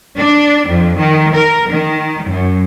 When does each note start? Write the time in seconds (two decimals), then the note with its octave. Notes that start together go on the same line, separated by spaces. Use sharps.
0.17 D4
0.69 F2
0.98 D#3
1.33 A#4
1.69 D#3
2.25 F#2